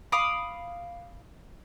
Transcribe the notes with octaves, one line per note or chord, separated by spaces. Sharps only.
F5 B5 D6 D#6